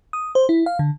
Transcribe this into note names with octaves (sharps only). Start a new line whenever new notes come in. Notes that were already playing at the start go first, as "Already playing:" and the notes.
D#6
C5
E4
F5
D3